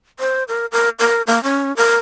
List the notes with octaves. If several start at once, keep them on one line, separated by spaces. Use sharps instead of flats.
C5
A#4
A#4
A#4
A#3
C#4
A#4